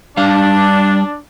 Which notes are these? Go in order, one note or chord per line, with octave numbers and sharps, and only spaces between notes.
G3 D4 F5